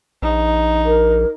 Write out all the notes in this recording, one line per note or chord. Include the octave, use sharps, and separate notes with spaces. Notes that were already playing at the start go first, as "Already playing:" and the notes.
A#1 D#4
A#4